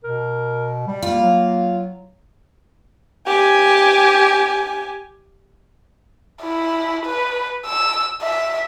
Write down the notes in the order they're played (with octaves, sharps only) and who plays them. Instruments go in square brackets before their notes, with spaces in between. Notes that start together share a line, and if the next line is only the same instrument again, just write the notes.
[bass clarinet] B2 [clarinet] A#4
[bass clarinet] G3
[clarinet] A#3 [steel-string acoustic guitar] F4
[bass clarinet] F#3
[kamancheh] G4 G#5
[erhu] E4
B4
E6
E5